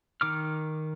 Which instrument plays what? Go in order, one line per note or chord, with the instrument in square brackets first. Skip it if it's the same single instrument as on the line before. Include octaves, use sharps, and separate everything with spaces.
[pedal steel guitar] D#3 D6 F6